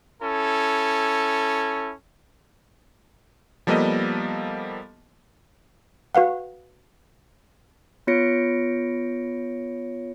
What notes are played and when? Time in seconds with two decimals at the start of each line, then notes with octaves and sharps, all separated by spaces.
0.22 C#4 E4 A4
3.67 F3 G3 A#3 B3 A4 D#5
6.15 F#4 B4 F5 F#5
8.07 B3 F4 C#5 A#6 C#7 D7